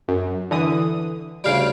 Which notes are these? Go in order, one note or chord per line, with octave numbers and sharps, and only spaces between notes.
F#2
D3 E3 D#6
D2 C#3 G3 F5 D7